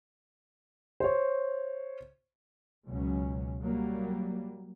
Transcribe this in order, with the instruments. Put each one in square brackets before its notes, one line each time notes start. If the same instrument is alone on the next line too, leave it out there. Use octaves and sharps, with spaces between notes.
[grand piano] C5 C#5
[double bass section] C#2 B2 F#3 C#4
F#3 G3 A#3